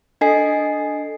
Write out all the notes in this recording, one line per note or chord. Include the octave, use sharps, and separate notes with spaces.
D4 A4 D#5 G#5 C7